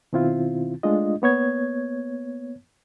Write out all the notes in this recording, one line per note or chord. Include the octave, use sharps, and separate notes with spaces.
B2 D#3 C4 E4 F4
G#3 A3 D4 F4 D#5
A#3 B3 C#5 G#6